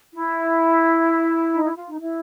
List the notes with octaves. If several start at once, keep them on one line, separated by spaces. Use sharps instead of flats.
E4
D#4
E4
F4
D#4
E4